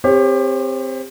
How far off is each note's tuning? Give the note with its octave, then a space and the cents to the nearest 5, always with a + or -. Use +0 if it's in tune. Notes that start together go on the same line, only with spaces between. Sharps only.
C4 +0 G4 +25 C#5 -20